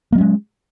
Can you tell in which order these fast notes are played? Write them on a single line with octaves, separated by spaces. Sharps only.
A#3 F#3 C#4 G#3